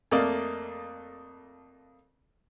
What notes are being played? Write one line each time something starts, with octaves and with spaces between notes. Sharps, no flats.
F2 A3 A#3 D5 D#5 F5